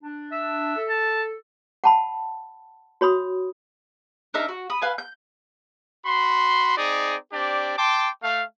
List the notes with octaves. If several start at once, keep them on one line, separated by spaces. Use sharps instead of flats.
D4
E5
A4
A5
F#5 A5 B5
F#4 C#5 B5 D#6
D4 D#4 A#4 E5
F#4
B5 D#6
B4 F5 G#5
G6
F#4 B5 C6
C4 D#4 G#4 D5
C4 D4 G4 D5
G5 A5 C6 D6
A3 F5